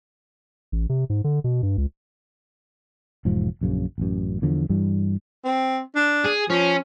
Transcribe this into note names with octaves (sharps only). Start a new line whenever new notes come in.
A1
C3
G#2
D3
B2
G2
C#2
E1 G#2 F3
A#1 F#2 C#3
A1 F#2
E2 D3 F3
G2 E3 G3
C4
D4
G#4
F3 C#4